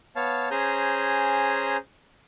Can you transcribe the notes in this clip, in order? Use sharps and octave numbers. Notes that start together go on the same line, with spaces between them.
B3 C#5 F5 A5
C#4 G#4 C5 G#5 A#5 G6